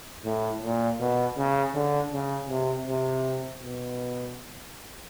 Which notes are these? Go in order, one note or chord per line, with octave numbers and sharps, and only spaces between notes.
A2
A#2
B2
C#3
D3
C#3
C3
C3
B2